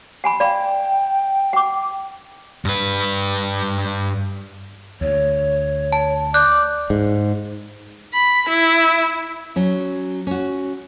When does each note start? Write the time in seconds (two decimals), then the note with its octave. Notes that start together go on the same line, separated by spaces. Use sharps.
0.24 F#5 G#5 B5
0.40 D5 F5 G5 B5
1.53 F#5 D6
2.65 G2 B4
5.01 D2 C#5
5.93 A5
6.34 D5 F#6 G6
6.90 G#2
8.13 B5
8.49 E4
9.56 F#3 C#4
10.27 C#4 F#4